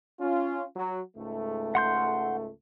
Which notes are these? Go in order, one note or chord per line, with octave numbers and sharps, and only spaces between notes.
C#4 F4
F#3
C#2 G#2 A3
F#5 C6 G6